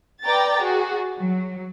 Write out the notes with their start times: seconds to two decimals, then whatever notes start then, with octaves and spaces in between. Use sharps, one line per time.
0.23 B4 D5 G5 A#5 A6
0.57 F#4 G#4
1.18 F#3